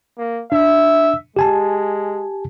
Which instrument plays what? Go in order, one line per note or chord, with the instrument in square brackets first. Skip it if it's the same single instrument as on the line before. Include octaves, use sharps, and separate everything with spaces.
[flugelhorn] A#3
[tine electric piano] D4 [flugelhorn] E5
[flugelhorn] G#3 [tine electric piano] G4 G#5 A5